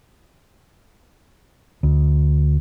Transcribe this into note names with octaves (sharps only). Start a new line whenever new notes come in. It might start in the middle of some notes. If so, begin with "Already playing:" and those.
D2